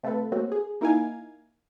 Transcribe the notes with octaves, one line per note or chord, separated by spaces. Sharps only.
C3 A3 F4 A4 B4
A3 A#3 C4 C#4 F#4
G#4
A#3 D#4 E4 A#4 F5 G#5